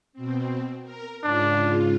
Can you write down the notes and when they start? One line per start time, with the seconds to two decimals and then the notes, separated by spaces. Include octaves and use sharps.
0.13 B2 C4
0.83 A#4
1.23 G#2 C#3 D4 F4